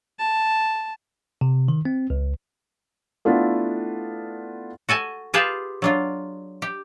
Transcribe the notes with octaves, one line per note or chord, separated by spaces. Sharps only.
A5
C3
D#3
C4
C#2
A3 B3 D4 E4 F4 A4
F#4 A4 G#5 A5
F4 G4 G#4 B4 F5 A5
F#3 D4 F4
G4